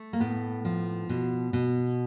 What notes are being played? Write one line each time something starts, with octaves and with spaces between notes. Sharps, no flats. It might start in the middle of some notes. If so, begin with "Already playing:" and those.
Already playing: A3
A#3
A2 B3
F3
B2
B2